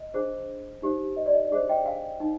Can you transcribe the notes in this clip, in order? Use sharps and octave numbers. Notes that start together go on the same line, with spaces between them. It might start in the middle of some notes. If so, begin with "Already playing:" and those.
Already playing: D#5
D4 G#4 C5
D#4 G4 C5
D#5
D5
D#5
D4 G#4 C5 D#5
D#5 G5
F5 G#5
D#4